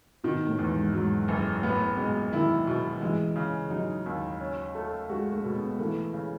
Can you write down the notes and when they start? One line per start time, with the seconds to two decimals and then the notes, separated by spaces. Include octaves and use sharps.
0.24 B2 D#3
0.47 A2
0.59 E2
0.71 G#2
0.93 G#2 F#3
1.28 F#1
1.62 A2 B3
1.97 B2 G#3
2.32 D#3 E4
2.67 B2
3.01 E3 G#3
3.36 C#3
3.70 F#3 D#4
4.06 D#2
4.40 C#4
4.75 A3
5.10 G#3 F#4
5.33 A3
5.44 B2
5.55 B3
5.79 E3 A3
6.13 C#3